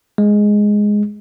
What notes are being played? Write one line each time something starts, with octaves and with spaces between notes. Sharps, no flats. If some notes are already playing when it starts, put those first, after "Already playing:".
G#3